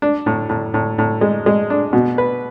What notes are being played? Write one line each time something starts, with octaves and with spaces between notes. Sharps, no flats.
D4
A2
A2
A2
A2
G#3
G#3
D4
B2
B4